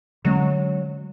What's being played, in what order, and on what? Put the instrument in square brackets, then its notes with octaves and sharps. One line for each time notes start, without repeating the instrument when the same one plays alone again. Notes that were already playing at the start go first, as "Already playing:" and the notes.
[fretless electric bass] D3 G#3 C#4 [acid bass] F#3